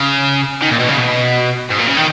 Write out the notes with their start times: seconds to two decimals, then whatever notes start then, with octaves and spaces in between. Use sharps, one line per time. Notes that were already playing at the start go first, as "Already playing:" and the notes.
Already playing: C#3
0.62 D#3
0.71 A#2
0.79 B2
0.89 C#3
0.98 B2
1.70 G#2
1.78 A#2
1.87 C#3
1.97 D#3